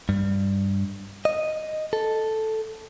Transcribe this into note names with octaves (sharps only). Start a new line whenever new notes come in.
G2
D#5
A4